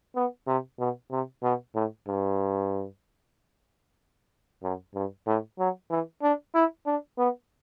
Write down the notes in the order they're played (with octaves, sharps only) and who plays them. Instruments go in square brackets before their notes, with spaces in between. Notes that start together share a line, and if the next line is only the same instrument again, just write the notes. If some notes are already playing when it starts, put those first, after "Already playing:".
[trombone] B3
C3
B2
C3
B2
A2
G2
F#2
G2
A2
F#3
E3
D4
E4
D4
B3